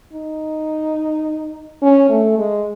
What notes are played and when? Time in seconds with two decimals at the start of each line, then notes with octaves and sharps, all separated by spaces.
0.13 D#4
1.82 C#4
2.10 A3
2.38 G#3